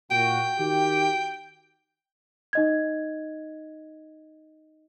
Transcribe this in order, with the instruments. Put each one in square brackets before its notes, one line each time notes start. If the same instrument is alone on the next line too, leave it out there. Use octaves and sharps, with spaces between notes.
[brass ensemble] A#2 F#4 [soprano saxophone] G5
[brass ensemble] D#3 F#4 G4
[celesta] D#4 D#5 G#6